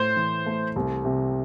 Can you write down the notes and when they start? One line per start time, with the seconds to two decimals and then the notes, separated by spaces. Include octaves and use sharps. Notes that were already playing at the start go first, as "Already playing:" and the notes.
Already playing: A2 C5
0.16 E3
0.46 A3
0.76 C2
1.05 C3